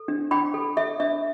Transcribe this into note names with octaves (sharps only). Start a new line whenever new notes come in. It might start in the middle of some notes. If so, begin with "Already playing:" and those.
Already playing: A4
D4
D4 G5 B5
A4
A4 E5
D4 E5